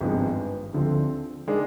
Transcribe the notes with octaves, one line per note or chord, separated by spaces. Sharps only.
G#1 G2 F3 G#3 B3
D2 D3 F3 C4
D#3 G#3 D4